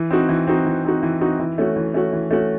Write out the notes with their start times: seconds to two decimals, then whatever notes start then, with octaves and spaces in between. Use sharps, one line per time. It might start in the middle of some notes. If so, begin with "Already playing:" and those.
Already playing: E3
0.11 C4 D#4 F#4
0.29 E3
0.47 C4 D#4 F#4
0.66 E3
0.85 C4 D#4 F#4
1.03 E3
1.21 C4 D#4 F#4
1.39 E3
1.58 A3 C#4 F#4
1.76 E3
1.94 A3 C#4 F#4
2.13 E3
2.31 A3 C#4 F#4